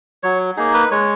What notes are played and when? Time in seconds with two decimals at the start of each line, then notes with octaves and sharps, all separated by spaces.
0.23 F#3 C#5
0.57 A#3 D#4 G#4
0.74 B4
0.91 G#3 C#5